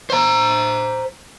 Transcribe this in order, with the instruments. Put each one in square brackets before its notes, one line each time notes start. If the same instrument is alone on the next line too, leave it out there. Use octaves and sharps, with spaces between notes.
[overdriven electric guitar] C5 A#5